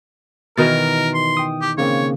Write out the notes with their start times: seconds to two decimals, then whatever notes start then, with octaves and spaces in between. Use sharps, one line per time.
0.57 B2 D#3 E3 A#4 A#5 A6
1.14 C6
1.37 G5 D#6
1.61 G4
1.78 C#3 A#3 C4 C#5